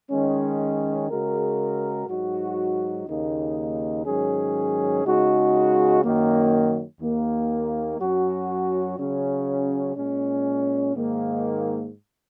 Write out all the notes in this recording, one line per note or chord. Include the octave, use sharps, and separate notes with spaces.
D#3 G#3 C#4
C#3 G#3 F#4 A#4
G#2 F#3 D#4 F#4
D#2 C#3 A#3 D#4
G#2 D#3 F#3 C#4 G#4
C#3 G#3 D#4 F#4
F#2 D#3 F#3 A#3
D#2 D#3 A#3
F#2 F#3 C#4 F#4
C#3 F#3 C#4
A#2 G#3 C#4
G#2 D#3 A#3